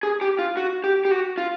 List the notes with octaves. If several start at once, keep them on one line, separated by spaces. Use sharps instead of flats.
G#4
G4
F4
F#4
G4
G4
F#4
F4